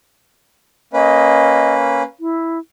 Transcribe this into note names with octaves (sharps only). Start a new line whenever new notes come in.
A#3 C#4 B4 D#5
E4